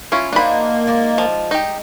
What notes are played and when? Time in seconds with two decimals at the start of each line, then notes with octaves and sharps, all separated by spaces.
0.12 C#4 E4 F4
0.33 A#3 D4 D#4 F#4 C5 B5
0.87 G#3 D5
1.18 F3
1.51 D#4 G4